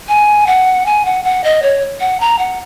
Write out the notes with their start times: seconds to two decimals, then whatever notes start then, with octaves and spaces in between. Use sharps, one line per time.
0.08 G#5
0.47 F#5
0.86 G#5
1.05 F#5
1.25 F#5
1.44 D#5
1.63 C#5
2.00 F#5
2.20 A#5
2.39 F#5